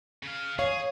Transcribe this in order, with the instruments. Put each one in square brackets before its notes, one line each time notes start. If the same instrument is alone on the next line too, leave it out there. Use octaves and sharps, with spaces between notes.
[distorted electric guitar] C#3 F5
[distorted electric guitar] G#4 [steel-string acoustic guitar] C#5 [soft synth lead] F5